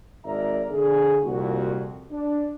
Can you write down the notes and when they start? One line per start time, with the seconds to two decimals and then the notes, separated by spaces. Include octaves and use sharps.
0.25 G#1 A#4 D5 E5 A#5
0.70 D3 G#4
1.22 C2 F2 A#2 F#4
2.10 D4